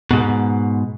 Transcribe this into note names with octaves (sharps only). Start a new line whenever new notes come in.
G#2 B2